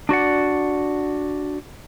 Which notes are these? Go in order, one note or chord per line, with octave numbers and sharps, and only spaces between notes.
D4 F#4 D5 F#5